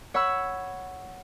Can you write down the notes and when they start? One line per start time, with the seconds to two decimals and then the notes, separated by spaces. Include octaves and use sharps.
0.14 C#5 F#5 B5 C#6 E6